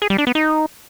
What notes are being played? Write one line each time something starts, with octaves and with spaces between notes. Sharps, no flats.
G#4
G3
D4
B3
D#4